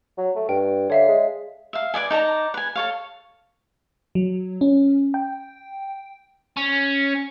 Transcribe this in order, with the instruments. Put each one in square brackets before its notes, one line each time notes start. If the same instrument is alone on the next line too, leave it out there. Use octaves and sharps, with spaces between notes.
[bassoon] F#3
A3
[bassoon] G2 [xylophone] G5
[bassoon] D3 [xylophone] C#5 E5 F5
[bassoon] G#3
[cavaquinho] E5 F5
B4 D5 D#5 G#5
D#4 D5 A5 A#5
B4 G#5
A4 C#5 F5
[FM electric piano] F#3
C#4
G5
[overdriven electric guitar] C#4